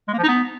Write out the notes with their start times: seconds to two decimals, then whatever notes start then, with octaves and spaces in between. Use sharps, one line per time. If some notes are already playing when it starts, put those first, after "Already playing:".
0.08 G#3
0.13 A#3
0.18 F3
0.24 D#4
0.29 B3